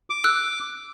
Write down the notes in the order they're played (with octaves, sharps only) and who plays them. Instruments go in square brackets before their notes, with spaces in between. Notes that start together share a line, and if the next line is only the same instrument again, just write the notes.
[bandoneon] D6
[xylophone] E6 F#6